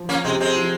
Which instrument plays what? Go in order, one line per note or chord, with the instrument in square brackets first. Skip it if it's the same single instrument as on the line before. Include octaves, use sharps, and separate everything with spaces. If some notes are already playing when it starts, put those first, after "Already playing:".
Already playing: [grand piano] F3
[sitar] A#3 C#4
[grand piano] C3 [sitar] G#3 C4
[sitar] G#3 C4
[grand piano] F3